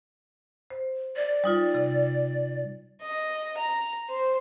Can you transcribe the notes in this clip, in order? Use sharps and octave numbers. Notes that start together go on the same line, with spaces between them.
C5
D5
G3 D#4 F4
C3
D#5
A#5
C5